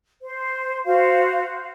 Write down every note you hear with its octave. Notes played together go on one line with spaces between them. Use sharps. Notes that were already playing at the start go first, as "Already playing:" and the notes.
C5
F#4 C5 F5